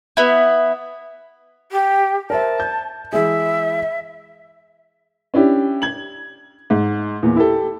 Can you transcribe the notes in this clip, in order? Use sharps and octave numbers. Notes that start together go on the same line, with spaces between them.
B3 E4
G4
A#4 C5 E5 A5
G6
E3 G#3 G#4 E5
C#4 D4 E4 G4
G#6 F#7
G#2
E2 A#2
E4 G4 A4